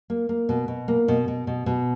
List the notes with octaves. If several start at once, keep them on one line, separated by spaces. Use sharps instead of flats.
A#3
A#3
B2
B2
A#3
B2
B2
B2
B2